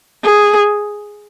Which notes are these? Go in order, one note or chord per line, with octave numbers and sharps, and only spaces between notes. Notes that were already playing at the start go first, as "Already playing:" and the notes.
G#4